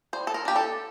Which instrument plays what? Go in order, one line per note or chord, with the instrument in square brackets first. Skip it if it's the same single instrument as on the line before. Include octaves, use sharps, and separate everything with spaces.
[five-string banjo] G3 C5
A4
A#4
A#3 D4 G4
A4